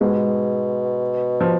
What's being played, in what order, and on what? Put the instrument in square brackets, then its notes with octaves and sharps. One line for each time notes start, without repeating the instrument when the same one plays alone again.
[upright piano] G#2 G#3 [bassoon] B2
[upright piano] F3